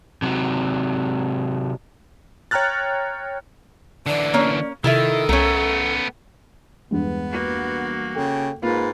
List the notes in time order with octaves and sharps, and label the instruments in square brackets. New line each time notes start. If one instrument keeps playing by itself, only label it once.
[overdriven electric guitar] C3 F#3
[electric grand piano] C#5 G5 A#5 F6 F#6 A6
[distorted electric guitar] D3 E3 [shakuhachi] D5
[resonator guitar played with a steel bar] A#3 C#4
[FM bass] C3 [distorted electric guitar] D#3 [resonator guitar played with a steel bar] E4 F4 E5 [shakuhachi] A4
[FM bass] C2 [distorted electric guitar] A3 B3 [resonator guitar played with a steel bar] C#4 A#4
[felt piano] E2 G2 G#3 [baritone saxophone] B3
[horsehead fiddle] A#3 F#4
[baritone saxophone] C#3 [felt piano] A4 [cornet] G5
[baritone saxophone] G#2 [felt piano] A#3 [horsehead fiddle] F4 [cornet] B4